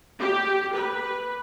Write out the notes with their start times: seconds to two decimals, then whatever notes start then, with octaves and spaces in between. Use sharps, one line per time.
0.19 G4
0.76 B4